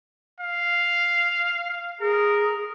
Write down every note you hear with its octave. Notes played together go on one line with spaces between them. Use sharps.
F5
G#4 A#4